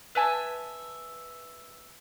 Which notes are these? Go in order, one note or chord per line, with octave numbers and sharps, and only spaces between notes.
B4 E5 G#5 A5